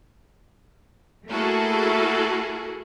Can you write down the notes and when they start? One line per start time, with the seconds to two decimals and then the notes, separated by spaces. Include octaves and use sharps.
1.28 A3 A#3 E4 F#4 G#4 A4